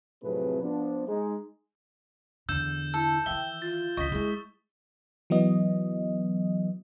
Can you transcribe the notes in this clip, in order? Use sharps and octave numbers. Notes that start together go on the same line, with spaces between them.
F2 A2 C3 F#3 G#4 B4
F3 B3 D4
G#3 D#4
E2 D3 E6 G6 E7
E4 A4
D#3 E3 E5 G5 G7
F4 A6
C#2 D3 D#5 C#6 B6
G#3 E4 G#4
E3 F#3 B3 D#5